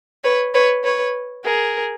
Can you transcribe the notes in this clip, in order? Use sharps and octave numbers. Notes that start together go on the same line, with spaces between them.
B4 C#5
B4 C#5
B4 C#5
G#4 A#4